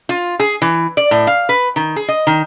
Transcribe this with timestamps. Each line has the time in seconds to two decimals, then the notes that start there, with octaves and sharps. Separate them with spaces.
0.09 F4
0.40 G#4
0.62 E3
0.97 D5
1.11 A2
1.27 F5
1.49 B4
1.76 D#3
1.96 G#4
2.08 D#5
2.27 D#3